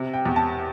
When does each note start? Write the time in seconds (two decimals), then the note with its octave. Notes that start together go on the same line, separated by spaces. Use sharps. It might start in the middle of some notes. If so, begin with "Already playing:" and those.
Already playing: C3
0.14 G5
0.26 E2
0.36 A5